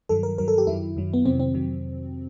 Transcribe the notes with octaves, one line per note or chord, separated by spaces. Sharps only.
G2 D#3 F#3 A4
A#4
G2 D#3 F#3 A#4
A4
G4
F#2 D#3 F#3 E4
F#2 D#3 F#3
B3
F2 C3 D#3 F#3 C4
C4
F2 C3 D#3 F#3